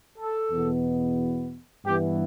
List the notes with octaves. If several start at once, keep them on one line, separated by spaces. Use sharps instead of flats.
A4
E2 B2 B3
G2 E3 B3 G4